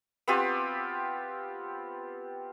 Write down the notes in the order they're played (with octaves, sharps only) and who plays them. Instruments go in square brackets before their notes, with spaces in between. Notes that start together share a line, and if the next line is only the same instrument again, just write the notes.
[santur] B3 C4 F4 G4